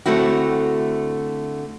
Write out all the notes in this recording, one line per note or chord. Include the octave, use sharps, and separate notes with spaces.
D3 A3 C4 E4 F#4